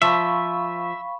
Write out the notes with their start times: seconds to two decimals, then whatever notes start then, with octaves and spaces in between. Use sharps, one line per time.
0.02 F3 E5 F5 B5 C#6